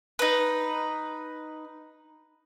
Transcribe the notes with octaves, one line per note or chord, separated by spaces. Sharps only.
D#4 B4